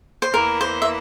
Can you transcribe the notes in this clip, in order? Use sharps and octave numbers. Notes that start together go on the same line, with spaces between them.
C5
E2 E3 A#3 E4 A#4
C5
E5